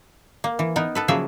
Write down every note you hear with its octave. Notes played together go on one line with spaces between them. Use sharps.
A#3
E3
B3 D#4 A#4
B3 A4 B4
C#3 F3 F#3 A#3 G#4 E5